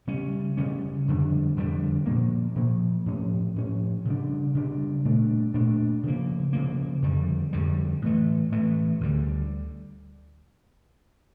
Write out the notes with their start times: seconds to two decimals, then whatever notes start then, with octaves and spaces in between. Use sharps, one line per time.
0.07 C#3 G3 C#4
0.57 C#3 G3 C#4
1.08 F2 D3 G3 D4
1.57 F2 D3 G3 D4
2.06 A#2 F3 A#3
2.56 A#2 F3 A#3
3.06 A2 F3 C#4
3.56 A2 F3 C#4
4.05 C#3 G3 D4
4.55 C#3 G3 D4
5.05 A#2 A3 D4
5.54 A#2 A3 D4
6.03 C#3 F3 A#3
6.53 C#3 F3 A#3
7.02 F2 D3 G3
7.53 F2 D3 G3
8.02 A2 E3 A3
8.52 A2 E3 A3
9.01 D2 D3 G3